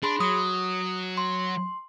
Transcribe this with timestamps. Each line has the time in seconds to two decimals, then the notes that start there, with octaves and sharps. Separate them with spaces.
0.03 D4 G#4 B5 C6
0.21 F#3 D#6
1.17 C6